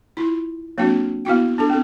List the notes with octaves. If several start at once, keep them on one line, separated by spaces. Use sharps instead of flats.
E4 F4
F#3 A#3 C4 D4 F#4
B3 E4 F#4 G5
B3 D4 G4 A4
C4 A4